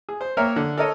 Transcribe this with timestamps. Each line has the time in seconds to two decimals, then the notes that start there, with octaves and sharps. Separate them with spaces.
0.09 G#4
0.21 C5
0.37 A#3 A#4 C#5 E5 G5
0.56 D3
0.77 A4 A#4 C#5 D#5